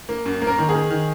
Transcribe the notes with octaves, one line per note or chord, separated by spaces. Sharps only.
A#3
F#2
A#3
A#4
D#3
G#4
D#3
D#3